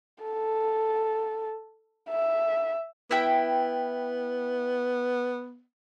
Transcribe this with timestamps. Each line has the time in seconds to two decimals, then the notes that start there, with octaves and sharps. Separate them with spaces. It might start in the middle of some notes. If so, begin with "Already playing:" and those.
0.24 A4
2.10 E5
3.11 B3 E4 G5